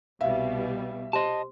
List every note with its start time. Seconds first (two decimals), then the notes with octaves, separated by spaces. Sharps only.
0.21 C2 B2 G3 E5 F5
1.13 G4 C5 D#5 A5 C6